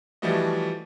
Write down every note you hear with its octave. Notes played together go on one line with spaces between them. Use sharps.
E3 F3 G3 A3 F#4 D#5